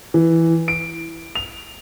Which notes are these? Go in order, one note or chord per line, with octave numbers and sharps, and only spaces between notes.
E3
D7
F7